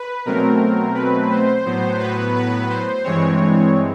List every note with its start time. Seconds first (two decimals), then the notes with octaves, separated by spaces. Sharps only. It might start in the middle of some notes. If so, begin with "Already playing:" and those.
Already playing: B4
0.25 B2 F#3 A3 C4 A#4
0.95 B4
1.31 C5
1.65 A2 F#3 B3
1.99 B4
2.35 B4
2.70 C5
3.04 G2 E3 G#3 C4 C#5